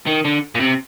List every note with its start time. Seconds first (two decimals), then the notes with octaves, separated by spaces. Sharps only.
0.06 D#3
0.25 D3
0.55 A#2
0.60 C3